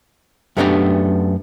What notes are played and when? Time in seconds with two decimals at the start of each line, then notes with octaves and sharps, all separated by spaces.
0.57 F#2 A3 B3 D4 G4 A#5